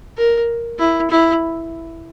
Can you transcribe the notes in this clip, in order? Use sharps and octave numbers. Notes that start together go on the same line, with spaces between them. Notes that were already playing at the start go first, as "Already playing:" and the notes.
A#4
E4
E4